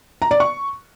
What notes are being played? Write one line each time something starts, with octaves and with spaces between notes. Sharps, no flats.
A#5
D5
C#6